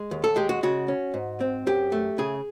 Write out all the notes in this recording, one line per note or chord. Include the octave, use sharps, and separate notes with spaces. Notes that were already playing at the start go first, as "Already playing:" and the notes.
Already playing: G#3
D#2
A4
G#3 G4
F#4
C#3 F#4
C#4
G#2
C4
F#2 G4
A3
C#3 G#4